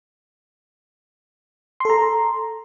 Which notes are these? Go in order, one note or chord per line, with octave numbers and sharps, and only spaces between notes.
A4 A#5 C6